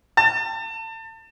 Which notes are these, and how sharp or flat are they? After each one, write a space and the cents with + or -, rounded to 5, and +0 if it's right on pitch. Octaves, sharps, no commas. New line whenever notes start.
A5 +30